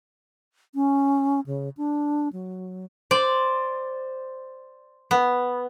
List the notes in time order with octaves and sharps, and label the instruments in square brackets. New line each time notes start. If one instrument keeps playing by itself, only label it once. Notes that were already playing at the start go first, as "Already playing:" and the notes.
[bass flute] C#4
C#3
D4
F#3
[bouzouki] C5 [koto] D5
[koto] B3